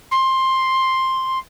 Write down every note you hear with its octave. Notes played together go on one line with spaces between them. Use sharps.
C6